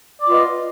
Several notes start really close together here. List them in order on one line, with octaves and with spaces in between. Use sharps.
D5 F4 B3 D#5